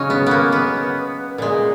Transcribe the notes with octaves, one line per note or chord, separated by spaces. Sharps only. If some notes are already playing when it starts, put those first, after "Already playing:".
Already playing: C#3 F#3 C#4 D#4
B3
A#3 B3
B3
A#2 G#3